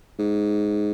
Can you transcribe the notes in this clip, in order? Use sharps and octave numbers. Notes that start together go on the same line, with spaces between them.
G#2